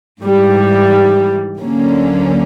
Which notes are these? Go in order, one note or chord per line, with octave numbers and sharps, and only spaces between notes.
G#2 E3 G3
D2 D3 F#3 A#3 C#4